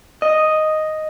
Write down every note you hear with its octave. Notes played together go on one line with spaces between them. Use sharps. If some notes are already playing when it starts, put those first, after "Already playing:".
D#5